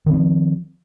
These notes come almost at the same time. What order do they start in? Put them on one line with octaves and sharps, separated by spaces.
D#3 C4 F3